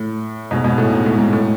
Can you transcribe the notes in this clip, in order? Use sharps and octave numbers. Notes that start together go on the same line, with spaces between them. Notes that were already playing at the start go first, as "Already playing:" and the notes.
Already playing: A2
G#2 B2
G#2 B2
A2
G#2
A2
G#2
A2